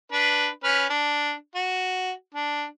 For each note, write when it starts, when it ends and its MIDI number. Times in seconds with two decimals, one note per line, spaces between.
0.12 0.48 62
0.12 0.48 71
0.64 0.85 61
0.64 0.85 71
0.64 0.85 89
0.90 1.32 62
1.55 2.11 66
2.35 2.64 62